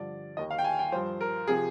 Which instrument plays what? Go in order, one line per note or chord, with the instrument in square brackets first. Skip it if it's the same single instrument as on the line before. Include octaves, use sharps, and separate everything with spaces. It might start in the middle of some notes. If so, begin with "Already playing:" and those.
Already playing: [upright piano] G2 D3 F3 D5
D#2 D#3 D#5
F5
G5
G#5
G5
G2 F3 C5
A#4
C3 F3 G#4